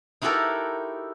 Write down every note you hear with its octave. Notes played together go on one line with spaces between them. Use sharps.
D#4 E4 F#4 G4 A4 A#4